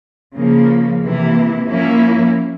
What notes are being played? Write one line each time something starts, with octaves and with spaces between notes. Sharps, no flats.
C#3 F3 A#3
C3 E3 A#3 E4
F3 A#3 C#4 E4